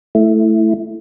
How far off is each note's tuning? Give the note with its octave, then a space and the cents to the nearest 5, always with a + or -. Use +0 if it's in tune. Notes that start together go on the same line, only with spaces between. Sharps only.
A3 +0 E4 +0